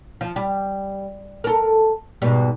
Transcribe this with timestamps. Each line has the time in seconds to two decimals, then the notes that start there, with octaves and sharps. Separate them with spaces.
0.21 F3
0.36 G3
1.44 A4 A#4
2.22 G#2 B2 G3